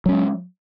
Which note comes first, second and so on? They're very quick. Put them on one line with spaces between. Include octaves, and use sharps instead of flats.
F#3 C#4 G#3